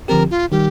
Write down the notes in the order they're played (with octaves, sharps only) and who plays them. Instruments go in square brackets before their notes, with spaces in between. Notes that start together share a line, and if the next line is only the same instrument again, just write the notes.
[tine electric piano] D3 F3 C4 G4 [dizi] A#4
[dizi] F4
[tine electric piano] D#3 G3 [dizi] G4